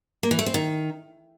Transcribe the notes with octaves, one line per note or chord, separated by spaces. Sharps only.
A#3
E3
A3
C4
D#3